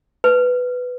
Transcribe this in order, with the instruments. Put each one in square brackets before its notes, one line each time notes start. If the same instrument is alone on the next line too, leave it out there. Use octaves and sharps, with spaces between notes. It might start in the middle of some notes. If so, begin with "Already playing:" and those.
[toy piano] B4